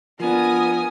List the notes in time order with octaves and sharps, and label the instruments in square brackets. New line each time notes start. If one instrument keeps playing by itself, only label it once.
[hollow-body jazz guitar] F3 D4 [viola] B3 F4 [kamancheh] A#4 D#6 [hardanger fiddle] G#5